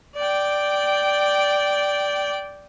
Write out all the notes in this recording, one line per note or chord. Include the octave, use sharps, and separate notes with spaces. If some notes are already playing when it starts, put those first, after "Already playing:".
D5 G5